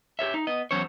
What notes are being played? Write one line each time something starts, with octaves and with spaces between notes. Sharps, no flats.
G4 A4 C#5 E5
D#4
B3 D#5
E2 F#3 C#4 C5 C#5